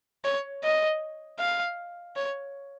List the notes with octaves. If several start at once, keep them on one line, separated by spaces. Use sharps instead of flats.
C#5
D#5
F5
C#5